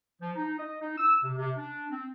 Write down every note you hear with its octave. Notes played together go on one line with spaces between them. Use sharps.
F3
D#4
D#5
D#4
E6
C3
C3
D4
C4